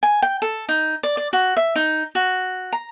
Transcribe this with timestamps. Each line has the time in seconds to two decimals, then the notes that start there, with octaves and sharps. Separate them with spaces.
0.03 G#5
0.22 G5
0.42 A4
0.69 D#4
1.03 D5
1.17 D5
1.33 F#4
1.57 E5
1.76 D#4
2.15 F#4
2.73 A#5